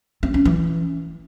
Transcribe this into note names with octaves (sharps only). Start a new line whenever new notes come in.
C4
C#4
E3